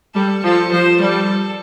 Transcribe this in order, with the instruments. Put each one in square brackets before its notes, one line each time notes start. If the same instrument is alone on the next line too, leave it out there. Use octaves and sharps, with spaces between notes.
[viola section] G3 [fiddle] A4
[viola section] F3 [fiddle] A4
[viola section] F3 [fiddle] C5
[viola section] G3 [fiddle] A4